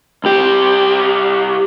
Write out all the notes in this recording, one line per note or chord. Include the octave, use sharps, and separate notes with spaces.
C2 G4